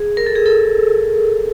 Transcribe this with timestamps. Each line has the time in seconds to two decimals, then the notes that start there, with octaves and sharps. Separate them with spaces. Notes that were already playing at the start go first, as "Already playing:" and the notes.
Already playing: G#4
0.17 A#4
0.26 A4
0.36 G#4
0.46 A4